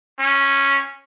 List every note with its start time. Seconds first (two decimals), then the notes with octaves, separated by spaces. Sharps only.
0.19 C#4